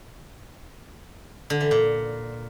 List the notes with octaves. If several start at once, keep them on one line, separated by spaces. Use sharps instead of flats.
D3
E3
A#2